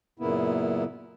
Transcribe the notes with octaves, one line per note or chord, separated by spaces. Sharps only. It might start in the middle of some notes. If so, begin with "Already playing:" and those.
F#2 A#2 C#3 A#3 B3 E4